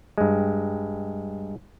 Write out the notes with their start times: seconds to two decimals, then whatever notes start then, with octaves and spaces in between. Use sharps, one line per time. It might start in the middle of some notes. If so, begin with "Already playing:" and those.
0.18 G2 G#3